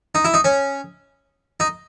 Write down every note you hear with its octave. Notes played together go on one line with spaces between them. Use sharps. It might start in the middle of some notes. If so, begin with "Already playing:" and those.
D#4
E4
D#4
C#4
D#4